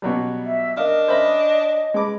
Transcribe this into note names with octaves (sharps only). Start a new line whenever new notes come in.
B2 F#3 G3
E5
D4 A#4 D#5 F5 F6
C5 C#5 E5 G#5 B5 A#6
G#3 B4 A5 B5 D6